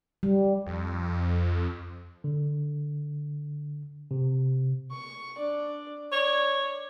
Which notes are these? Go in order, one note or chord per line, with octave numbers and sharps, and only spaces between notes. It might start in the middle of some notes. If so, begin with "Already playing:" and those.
G3
F2
D3
C3
C#6
D4 D5
C#5 D5